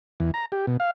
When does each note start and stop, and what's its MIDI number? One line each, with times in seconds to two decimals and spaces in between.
0.20 0.31 40
0.34 0.45 82
0.52 0.66 67
0.67 0.77 47
0.80 0.91 77